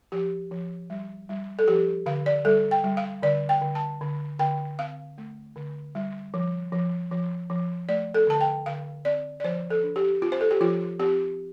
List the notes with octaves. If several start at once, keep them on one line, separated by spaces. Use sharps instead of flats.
F3 G4
F3
G3
G3
A4
F3 G4
D3 F5
D5
G3 A4
G5
G3
F5
D3 D5
G5
D3
A5
D3
D3 G5
C4 F5
A3
D3
G3
F3
F3
F3
F3
A3 D5
A4
D3 A5
G5
D3 F5
C4 D5
D5
F3 C5
A4
D4
G4
C4 F4
C5
A4
G4
F3 F4
C4 G4